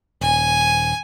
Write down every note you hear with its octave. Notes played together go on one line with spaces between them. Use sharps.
D#1 G#5